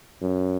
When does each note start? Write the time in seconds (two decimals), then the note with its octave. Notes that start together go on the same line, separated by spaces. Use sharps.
0.22 F#2